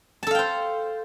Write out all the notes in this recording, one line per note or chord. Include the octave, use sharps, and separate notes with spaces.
A4 C5 F5 G5 A5